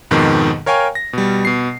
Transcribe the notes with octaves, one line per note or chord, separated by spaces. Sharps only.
F2 G#2 B2 D#3
A#4 C#5 F5 G5 G#5 C#6
A#6
B2 G3
B2 C7